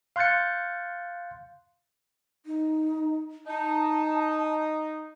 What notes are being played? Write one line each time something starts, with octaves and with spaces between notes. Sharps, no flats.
F5 C6 F#6 G6 A6 C#7
D#4
D#4 A5